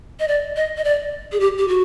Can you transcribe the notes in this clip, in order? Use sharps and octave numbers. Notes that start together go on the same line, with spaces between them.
D#5
D5
D#5
D#5
D5
G#4
G4
G4
F#4